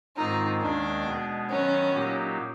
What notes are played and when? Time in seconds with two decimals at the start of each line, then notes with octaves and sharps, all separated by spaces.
0.16 G#2 D#3 G#3 C4 D#4 F4
0.60 D#2 D#3 G#3 C#4 D4
1.05 B2 G#3 B3
1.49 D#3 F#3 B3 C#4
1.93 A#2 F#3 A#3 D#4 G4